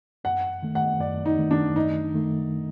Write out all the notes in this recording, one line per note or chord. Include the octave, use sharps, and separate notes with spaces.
F#2 F#5
D#3 A3
F#5
F#2 D5
D#4
D#3 A3
D4
F#2 D#4
D#3 A3